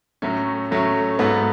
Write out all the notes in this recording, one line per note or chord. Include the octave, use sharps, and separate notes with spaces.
A2 F#3 A3 C#4
A2 F#3 A3 C#4
G#2 F#3 B3 F#4 A4